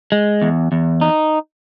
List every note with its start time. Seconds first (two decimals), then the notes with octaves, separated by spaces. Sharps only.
0.12 G#3
0.42 E2
0.72 E2
1.01 D#4